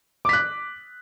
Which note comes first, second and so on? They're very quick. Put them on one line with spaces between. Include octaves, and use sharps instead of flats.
D6 B6 F#6